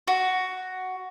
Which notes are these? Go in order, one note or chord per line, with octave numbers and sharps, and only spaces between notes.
F#4